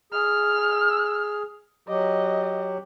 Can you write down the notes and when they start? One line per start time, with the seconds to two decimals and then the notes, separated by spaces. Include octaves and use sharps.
0.12 G#4 F6
1.88 F#3 G4 D#5